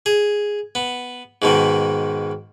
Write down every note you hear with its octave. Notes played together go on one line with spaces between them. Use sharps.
G#4
B3
G#2 B2 D#3